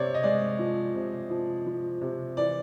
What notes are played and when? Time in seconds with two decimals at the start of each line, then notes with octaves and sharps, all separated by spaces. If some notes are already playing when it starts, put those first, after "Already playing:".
Already playing: C3 C4 C#5 D5
0.14 D#5
0.23 G#3 D5
0.59 F3
0.95 C3
1.30 F3
1.66 F3
2.01 C3
2.37 E3 D5